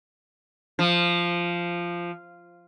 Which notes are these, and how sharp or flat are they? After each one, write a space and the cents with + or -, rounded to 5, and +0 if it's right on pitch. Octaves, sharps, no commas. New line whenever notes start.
F3 -10